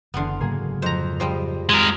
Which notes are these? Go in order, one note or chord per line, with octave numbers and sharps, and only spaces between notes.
F#1 D3 E3 B3 C6 F6
G#2 C#3 F#3 A#3 G#4
F2 C5 A#5
F3 G3 G#3 C5
G#3 A#4